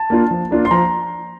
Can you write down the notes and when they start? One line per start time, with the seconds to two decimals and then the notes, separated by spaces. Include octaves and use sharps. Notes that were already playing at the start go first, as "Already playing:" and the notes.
Already playing: A5
0.10 A#3 D4 F4
0.31 F3
0.51 A#3 D4 F4
0.65 C6
0.71 F3 A#5